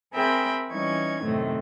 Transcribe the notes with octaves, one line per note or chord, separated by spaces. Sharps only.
C4 G#4 A#4 E5 G5 B5
E3 G3 C#4 D#4 C#6 G#6
F#2 A2 C3 D#3 A3